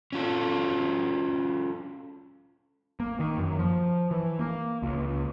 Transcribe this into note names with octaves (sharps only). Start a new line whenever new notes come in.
C#4 F4 A4
A#3
D#3
F#2
F3
E3
A#3
C#2